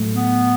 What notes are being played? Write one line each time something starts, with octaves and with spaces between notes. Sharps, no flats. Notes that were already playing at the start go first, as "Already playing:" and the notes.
Already playing: A2 F#3 A3
B3